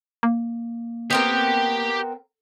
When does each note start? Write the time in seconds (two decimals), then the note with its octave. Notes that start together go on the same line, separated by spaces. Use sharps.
0.23 A#3
1.10 B3 C4 G4 A#4 G5